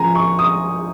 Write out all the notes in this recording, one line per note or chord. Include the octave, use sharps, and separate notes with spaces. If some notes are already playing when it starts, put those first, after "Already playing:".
Already playing: C#2 C#3 F3 G#5 A#5
C#6
D#6